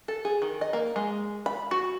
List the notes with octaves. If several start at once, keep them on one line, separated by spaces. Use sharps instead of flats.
A4
G#4
D#3
D#5
A#3
G#3
B5
F#4